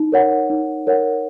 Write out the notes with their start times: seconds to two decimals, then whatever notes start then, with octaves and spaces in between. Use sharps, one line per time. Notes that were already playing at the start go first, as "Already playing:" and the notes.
Already playing: D#4
0.12 A#4 C#5 F#5
0.50 D#4
0.87 A#4 C#5 F#5